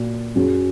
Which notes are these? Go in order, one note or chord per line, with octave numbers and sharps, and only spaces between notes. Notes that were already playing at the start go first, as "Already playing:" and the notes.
Already playing: A#2 A#3 F#4
F#2 F#3 C#4 G#4